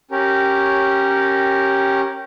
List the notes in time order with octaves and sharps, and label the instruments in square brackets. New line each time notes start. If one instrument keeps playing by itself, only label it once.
[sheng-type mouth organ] C#4 G4 A#4